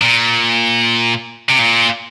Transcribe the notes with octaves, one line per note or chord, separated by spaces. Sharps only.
A#2
C3
A#2